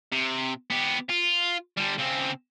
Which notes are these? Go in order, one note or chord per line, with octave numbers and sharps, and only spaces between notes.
C3
B3 G4
F4
D3 G3
C#3 C4